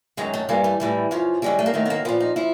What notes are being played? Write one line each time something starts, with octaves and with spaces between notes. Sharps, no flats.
F#2 D#3 F#3 G#3
A3
G2 E3 G3 A#3
A3
A2 E3 G3
F#2 C#3 F3
F#2 D3 G3 G#3
A3
A#3
G#2 D#3 F#3 A3
B3
A#3
A#2 F3 B3
D#4
F3 E4